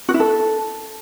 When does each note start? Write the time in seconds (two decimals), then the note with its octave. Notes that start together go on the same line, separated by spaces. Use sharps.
0.09 F#4
0.14 E4
0.20 A4